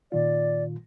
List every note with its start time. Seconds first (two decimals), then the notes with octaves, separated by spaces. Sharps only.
0.12 A#2 D#3 F4 D5